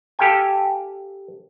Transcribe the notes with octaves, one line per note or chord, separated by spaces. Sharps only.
G4 A4 F5 G5 G#5